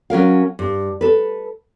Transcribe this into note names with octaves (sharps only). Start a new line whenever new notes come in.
F#3 C#4 A#4 F5
G2
A4 B4